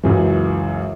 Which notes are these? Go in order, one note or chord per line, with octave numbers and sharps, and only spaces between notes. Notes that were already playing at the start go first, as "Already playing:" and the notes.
C#2 F#2 E3